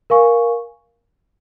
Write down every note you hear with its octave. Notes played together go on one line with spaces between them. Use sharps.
A#4 F5 G#5 C#6